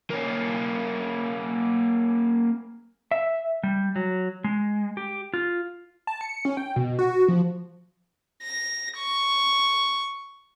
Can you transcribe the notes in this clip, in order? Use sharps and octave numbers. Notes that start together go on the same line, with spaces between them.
A#3 C#4
E5
G3
F#3
G#3
G4
F4
A5
C#7
C#4
G5
B2
F#4
F3
A#6
C#6